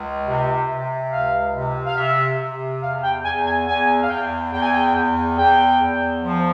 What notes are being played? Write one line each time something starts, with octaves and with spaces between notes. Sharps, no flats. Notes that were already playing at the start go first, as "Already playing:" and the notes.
Already playing: C#2
C3
C3
C#2 F5
C3
F5
C3 E5
C3
E2 F5
G5
E2 G#5
G#5
E2 G#5
F5
E2 G5
E2 G5
G#5
G5
E2
E2 G5
E2
F3